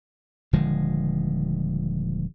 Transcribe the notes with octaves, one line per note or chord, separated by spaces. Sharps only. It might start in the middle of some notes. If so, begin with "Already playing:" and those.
D#1 D3 F3 G#3